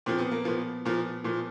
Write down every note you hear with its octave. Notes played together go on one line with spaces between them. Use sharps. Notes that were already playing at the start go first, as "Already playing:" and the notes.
A#2 F3 C4
B3
A#3
A#2 F3 B3
A#2 F3
A#2 F3